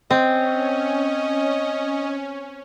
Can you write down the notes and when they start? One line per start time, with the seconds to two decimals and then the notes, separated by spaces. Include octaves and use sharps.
0.11 C4 C#4 D#5